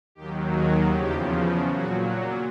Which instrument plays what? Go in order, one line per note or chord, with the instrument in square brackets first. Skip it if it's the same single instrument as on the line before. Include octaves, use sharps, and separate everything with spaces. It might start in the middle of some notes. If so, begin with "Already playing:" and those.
[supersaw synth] D#2 D#3 F#3 G4
G#4
E2 C#3 F3 G4
A#2 F#3 F#4